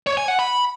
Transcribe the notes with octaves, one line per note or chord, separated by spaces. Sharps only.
C#5
G#5
F#5
B5